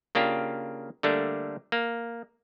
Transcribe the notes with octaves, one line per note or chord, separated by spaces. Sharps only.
C#3 A#3 D4 F4 G4
D3 G3 A3 A#3 D4
A#3